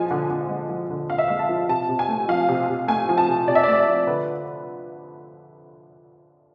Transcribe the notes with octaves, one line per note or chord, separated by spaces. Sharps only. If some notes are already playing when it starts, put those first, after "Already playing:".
Already playing: F3 G#3 G#5
D3
D3
G#3
F3
D3
D3 F5
E5
G#3 F5
A5
F3
C3 A5
C3
G#5
A3
F3 F5
C3
C3
A3 G#5
F3
A5
C3
C3 D5
E5
A3 D5
F3
D3 B4